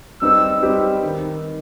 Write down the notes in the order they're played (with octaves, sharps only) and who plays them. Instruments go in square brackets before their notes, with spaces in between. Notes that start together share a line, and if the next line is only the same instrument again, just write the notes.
[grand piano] G3 C4 D#4 G4 B4 [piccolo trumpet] E6
[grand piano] G3 C4 D#4 G4 B4
D#3